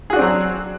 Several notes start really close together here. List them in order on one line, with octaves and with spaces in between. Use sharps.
G#4 F#4 D4 C4 F#3